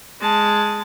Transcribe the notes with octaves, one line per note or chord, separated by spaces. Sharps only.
G#3 A5